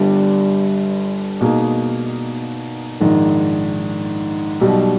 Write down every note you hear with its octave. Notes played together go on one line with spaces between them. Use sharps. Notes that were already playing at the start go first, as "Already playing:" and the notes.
Already playing: G1 G2 G3
B2 A#3 D#4 G#4
A#1 G#2 D#3
B1 B2 G3